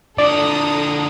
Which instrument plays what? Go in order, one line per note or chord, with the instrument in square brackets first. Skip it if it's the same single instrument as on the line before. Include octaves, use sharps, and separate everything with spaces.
[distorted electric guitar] D3 F3 [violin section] A4 A#5 D#6 [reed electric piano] D5